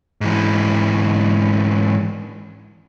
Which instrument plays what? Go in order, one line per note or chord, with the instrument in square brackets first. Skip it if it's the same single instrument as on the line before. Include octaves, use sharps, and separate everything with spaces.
[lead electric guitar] G#2 E3